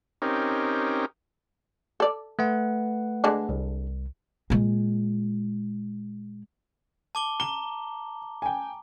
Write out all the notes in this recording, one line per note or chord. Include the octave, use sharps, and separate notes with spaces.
C4 C#4 D#4 G4 A#4
A4 D5
A3 B4 F#5
D3 G#3 D4
C2
A#2 G#3
A5 D6 G7
A#5 G7
G5 G#5